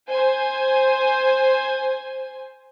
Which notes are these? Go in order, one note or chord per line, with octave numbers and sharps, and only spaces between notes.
C5 G#5